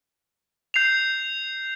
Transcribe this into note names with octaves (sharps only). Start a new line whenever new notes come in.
G6 C7 F7